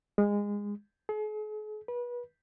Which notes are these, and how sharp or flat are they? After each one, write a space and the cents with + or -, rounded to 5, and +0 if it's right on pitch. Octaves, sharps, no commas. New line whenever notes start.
G#3 -20
G#4 +45
B4 -30